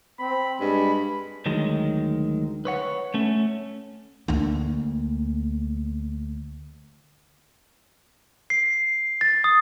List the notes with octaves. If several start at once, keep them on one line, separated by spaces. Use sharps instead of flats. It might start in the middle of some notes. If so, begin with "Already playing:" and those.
C4 B5
G2 G#3 B5
D2 D#3 F#3 G#3
B4 C#5 F#5
A3 C#4
D2 A#3
C7
A6
D#6